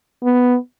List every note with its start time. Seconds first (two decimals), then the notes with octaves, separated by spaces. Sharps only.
0.24 B3